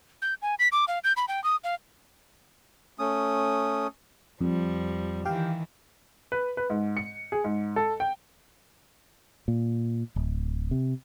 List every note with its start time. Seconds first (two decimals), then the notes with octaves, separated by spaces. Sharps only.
0.22 G6
0.42 G#5
0.59 B6
0.72 D6
0.88 F5
1.04 G6
1.17 B5
1.28 G5
1.44 D#6
1.64 F5
2.99 A3 C#4 D#6
4.41 F2 F3 G3
5.25 D#3 E3 G4 F5 G5
6.32 B4
6.57 B4
6.70 G#2
6.97 C#7
7.32 G#4
7.44 G#2
7.76 A4
8.00 G5
9.48 A#2
10.16 D1
10.71 C3